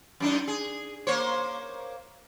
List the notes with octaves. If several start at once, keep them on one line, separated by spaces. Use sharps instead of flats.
F#2 D4 D#4
G#4
A#3 C5 C#5